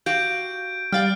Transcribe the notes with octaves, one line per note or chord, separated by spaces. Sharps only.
F#4 G4 F5 G6 D7
G3 D5 F5 G5 F6 A6 D7